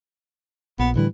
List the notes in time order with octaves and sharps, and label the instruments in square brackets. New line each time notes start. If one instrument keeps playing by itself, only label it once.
[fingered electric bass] A#1 [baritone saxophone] B3
[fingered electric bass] A2 D3 G3 [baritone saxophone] E3